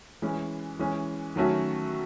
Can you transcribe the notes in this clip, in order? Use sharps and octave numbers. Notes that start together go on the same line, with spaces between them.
E3 G#3 C#4
E3 G#3 C#4
D#3 F#3 A3 C#4 F#4